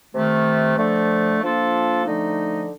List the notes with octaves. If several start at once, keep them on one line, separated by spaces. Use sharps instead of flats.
C3 D#3 A3
D3 F3 A3
F3 A#3 D4 F4 A4
D3 F3 A3 D#4